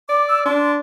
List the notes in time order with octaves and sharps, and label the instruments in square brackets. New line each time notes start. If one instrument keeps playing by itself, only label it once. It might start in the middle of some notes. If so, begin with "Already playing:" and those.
[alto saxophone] D5 [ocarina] D6
[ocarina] E6
[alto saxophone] D4 [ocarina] C6